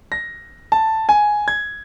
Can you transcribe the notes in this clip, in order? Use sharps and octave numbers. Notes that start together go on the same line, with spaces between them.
A#6
A5
G#5
G#6